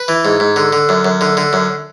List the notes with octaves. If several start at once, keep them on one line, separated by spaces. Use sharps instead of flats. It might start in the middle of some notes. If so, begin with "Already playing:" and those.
Already playing: B4
E3
G#2
G#2
D3
D3
F#2
F#2
D3
D3
F#2